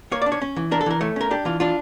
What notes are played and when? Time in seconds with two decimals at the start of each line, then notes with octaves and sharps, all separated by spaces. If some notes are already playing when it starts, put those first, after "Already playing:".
0.11 A#3 C#5
0.22 D5
0.26 D4
0.32 C#5
0.42 C#4
0.56 E3
0.71 D4 A#4
0.81 A4
0.86 E3 A#4
1.01 A3 C#5
1.16 C#4 A#4
1.31 D4 G4
1.45 E3 F4
1.60 D4 F4